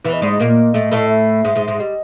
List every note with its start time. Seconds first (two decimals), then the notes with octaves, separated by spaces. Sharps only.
0.04 E2 E3 B4
0.13 D#5
0.22 G#2 G#3 D5
0.32 D#5
0.40 A#2 A#3
0.74 A2 A3
0.91 A2 A3
1.09 E5
1.45 G#2 G#3
1.55 G#2 G#3
1.66 G#2 G#3 E5
1.80 G3 D#5